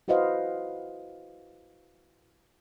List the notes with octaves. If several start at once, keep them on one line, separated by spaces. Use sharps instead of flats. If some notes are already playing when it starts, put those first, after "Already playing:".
E4 F#4 B4 C5 D#5 F5